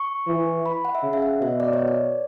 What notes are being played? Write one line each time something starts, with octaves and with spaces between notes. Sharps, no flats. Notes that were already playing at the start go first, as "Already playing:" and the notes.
Already playing: C#6
E3
B5
F#5
E5
C#3
E5
F#5
B2 E5
D5
C#5
D5